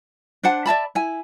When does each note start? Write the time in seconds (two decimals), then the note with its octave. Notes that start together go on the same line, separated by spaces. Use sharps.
0.43 D4 C5 F#5 A5
0.66 D5 E5 A5 B5
0.95 E4 G#5